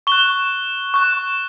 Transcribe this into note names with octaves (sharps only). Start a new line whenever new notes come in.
C#6 F#6 G7
C#6 F#6